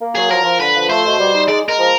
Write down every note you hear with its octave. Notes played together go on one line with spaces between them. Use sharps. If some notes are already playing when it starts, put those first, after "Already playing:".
A#3
F#3 G#4
F3 A#4
F3
D3 B4
F3
A3 C5
B2
G3
D#4
G#3 D5
G#3 A#4
F3